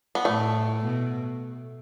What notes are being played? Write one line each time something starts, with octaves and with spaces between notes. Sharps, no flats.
B3
A2 A3
B2